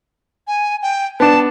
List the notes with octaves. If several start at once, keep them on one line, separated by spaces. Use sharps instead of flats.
G#5
G5
B3 D4 A5